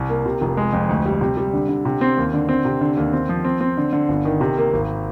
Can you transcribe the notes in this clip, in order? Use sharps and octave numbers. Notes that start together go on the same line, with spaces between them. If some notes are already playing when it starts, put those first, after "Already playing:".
Already playing: C2
A#3
C3
F1
G#3
F2
D2
G3
C3
G3
D3
D3
C3
C4
D#2
D3
C4
C3
D3
D#2
C4
F3
C4
C4
D3
D3
G1
D#3
C3
A#3
G#1